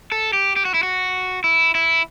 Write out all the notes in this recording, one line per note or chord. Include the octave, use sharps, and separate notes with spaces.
A4
G4
G4
F#4
E4
F#4
E4
E4